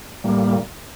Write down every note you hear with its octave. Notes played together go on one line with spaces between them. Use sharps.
A2 G3 A#3